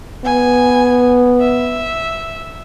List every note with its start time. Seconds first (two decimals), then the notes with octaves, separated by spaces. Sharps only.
0.25 B3 G#5
1.40 E5